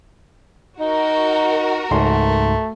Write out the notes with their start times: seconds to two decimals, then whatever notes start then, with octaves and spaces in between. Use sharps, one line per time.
0.80 D#4 F#4 A#4
1.91 C#2 G#2 A3 C6